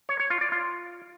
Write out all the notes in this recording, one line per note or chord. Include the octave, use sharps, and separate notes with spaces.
C#5
C#5
F4
D5
F4